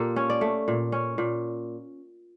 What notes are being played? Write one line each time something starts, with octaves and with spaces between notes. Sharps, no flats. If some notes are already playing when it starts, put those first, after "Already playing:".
Already playing: A#2 A#3 F4 G4 A4
C#4
D5
A3
A#2
C#4
A#2